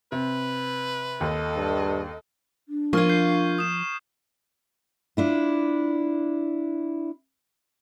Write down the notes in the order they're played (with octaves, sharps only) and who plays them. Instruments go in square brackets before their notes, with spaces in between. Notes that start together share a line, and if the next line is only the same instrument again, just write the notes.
[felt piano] C3 [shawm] B4
[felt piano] D#2 [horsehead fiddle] A4 D#5
[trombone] G2
[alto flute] D4
[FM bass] F3 [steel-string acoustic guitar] A#3 F4 [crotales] C#6 F6 G#6
[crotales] G6 C7
D#6 E7
[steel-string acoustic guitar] D4 E4 F4